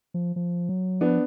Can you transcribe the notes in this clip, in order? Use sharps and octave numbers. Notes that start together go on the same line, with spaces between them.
F3
F3
F#3
F3 B3 D4